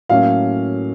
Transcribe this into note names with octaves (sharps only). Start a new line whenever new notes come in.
A2 F#3 A#3 C#4 F5